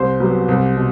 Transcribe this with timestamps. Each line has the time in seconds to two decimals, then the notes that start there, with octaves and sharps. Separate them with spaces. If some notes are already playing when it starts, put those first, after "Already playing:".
Already playing: C2 C5 C6
0.20 C3 F#3 B3
0.48 C2
0.76 B2